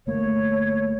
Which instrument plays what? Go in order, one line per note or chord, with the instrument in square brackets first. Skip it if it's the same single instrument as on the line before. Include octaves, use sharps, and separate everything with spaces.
[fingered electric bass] G1 A3 A#3 [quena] C#5